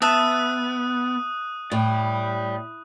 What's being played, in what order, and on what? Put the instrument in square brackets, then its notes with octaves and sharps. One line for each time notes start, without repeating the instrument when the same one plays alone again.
[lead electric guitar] B3 [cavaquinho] E5 A5 [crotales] D#6 F#6 D#7
[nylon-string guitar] A2 [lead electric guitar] D5 G5